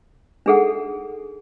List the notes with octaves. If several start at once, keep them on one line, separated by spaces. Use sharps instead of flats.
D4 D#4 G#4 A4 F#5